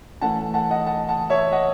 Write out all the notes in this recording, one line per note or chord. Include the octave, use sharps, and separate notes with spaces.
E3 A3 C#4 F#5 A5
F#5 A5
D#5 F#5
F#5 A5
F#5 A5
C#5 E5
D#5 F#5